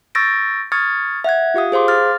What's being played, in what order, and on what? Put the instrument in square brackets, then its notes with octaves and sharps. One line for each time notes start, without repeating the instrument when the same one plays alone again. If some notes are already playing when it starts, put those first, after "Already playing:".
[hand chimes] C#6 E6 G6 A6 A#6 D7
C#6 D#6 F6 G#6 A6 C#7
E5 F#5 F#6 G#6
F4 G4 F5 D#6
G#4 C5 F5 C6 D6
F6 A6